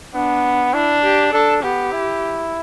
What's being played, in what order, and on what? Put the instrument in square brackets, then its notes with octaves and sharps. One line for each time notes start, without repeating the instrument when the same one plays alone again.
[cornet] B3 [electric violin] D4
[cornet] D4 [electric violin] E4
[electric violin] G4
[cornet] D4 [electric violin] A4
[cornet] B3 [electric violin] G4
[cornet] E4